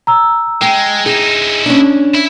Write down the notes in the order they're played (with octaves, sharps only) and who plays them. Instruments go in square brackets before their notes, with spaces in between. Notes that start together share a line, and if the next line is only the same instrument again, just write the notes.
[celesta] A#5 E6
[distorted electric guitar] G#3 [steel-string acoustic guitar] G5
[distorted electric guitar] D#4 E4 [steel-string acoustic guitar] G#4
[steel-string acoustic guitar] C#4 D4
[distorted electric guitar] E4